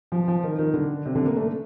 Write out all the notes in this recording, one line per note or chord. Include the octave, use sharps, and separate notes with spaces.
F3
F3
D#3
D#3
D3
C3
D3
A#3
A3